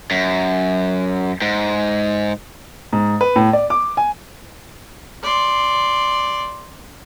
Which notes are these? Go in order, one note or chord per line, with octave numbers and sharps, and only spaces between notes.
F#2
G#2
G#2
B4
A2
D5
D6
G#5
D5 C6